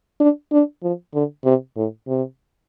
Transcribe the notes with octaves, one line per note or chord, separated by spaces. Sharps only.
D4
D4
F3
D3
C3
A2
C3